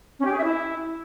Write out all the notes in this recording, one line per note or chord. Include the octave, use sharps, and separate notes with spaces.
C#4
G4
G#4
E5
E4